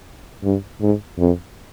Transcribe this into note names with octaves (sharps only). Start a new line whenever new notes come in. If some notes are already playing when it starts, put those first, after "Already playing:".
G2
G#2
F2